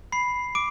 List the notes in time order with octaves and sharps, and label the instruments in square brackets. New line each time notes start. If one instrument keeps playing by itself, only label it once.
[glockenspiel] B5 C7
D6 D7